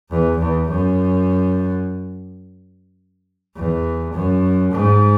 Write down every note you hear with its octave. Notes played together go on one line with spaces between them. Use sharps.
E2
E2
F#2
E2
F#2
G#2